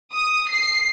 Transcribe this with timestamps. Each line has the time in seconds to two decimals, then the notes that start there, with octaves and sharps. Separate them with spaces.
0.13 D#6
0.50 C7